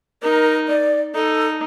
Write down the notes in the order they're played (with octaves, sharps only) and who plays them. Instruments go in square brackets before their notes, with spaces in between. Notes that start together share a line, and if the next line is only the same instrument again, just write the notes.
[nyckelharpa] D#4 [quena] A#4
[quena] D5
[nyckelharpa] D#4 [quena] A4